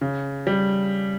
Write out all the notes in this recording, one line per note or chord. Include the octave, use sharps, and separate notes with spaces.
C#3
G3